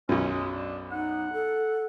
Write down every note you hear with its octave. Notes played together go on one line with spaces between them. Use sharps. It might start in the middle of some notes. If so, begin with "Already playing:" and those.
B1 F#2 C#4
G#3
D4
D#4 F#5
A4